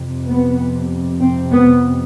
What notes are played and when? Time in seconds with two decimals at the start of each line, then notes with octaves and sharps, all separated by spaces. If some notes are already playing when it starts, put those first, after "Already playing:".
Already playing: F2 C3
0.28 B3
1.21 C4
1.52 B3